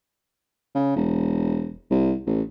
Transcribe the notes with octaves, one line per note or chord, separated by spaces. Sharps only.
C#3
E1
C2
A1